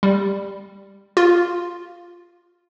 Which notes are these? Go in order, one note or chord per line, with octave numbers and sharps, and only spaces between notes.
G3
F4